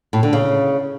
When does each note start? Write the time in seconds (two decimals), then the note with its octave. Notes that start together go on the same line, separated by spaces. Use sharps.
0.13 A2
0.23 D3
0.33 C#3